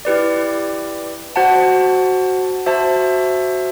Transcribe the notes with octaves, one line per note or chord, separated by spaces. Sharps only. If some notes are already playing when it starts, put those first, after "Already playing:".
E4 G4 B4 D5
F#4 C5 F#5 A5
F#4 C5 E5 A5